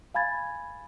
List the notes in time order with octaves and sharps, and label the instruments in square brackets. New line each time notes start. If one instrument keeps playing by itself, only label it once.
[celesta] F5 G#5 B5 G#6 A6